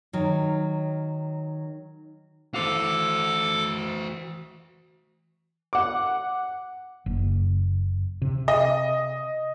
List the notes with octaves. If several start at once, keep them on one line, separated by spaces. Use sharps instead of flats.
D#3 F#3
E3 F#4 A4 C5 F5 D6
F#5 D6
F#1
C3
D#5